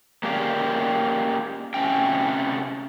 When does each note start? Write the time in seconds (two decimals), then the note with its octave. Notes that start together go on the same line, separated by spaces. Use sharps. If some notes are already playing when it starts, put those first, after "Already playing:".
0.23 A#3 C#4 G4 G#4 D5 F5
1.74 C3 A3 C#4 G5